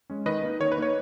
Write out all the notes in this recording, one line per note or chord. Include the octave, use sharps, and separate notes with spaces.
G#3 C#4
D#3 B4 D#5
A#3 D#4
D#3 C#5
B4
A#3 D#4 C#5